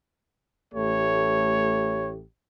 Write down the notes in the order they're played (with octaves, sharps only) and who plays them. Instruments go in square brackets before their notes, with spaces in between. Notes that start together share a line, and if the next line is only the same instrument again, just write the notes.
[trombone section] A1 A3 G4 [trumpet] C#5